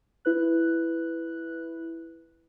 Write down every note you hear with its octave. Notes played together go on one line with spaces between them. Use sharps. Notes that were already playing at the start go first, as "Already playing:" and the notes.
E4 B4 F#6